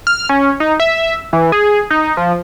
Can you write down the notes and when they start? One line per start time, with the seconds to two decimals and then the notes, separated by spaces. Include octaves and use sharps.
0.07 F6
0.29 C#4
0.60 D#4
0.80 E5
1.33 E3
1.52 G#4
1.90 D#4
2.17 F3